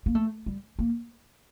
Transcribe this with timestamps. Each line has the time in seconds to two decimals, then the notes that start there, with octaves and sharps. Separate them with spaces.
0.06 A#3
0.15 A3
0.46 G3
0.79 A#3